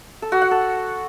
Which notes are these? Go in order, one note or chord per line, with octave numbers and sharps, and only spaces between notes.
A4
F#4
F#5
A4